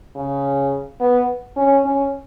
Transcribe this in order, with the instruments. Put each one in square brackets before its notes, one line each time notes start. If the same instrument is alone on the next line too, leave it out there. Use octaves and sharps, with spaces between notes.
[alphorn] C#3
B3
C#4
C#4